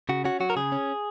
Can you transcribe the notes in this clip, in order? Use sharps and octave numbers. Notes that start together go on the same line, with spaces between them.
C#3 F#4
C#4 F#4
F#3 F#4
A#4
C#3 G#4
C#4